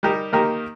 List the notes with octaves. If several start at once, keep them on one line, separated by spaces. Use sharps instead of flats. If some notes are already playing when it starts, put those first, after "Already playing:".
G3 D#4 G4 A#4
D#3 A#3 D#4 G4 A#4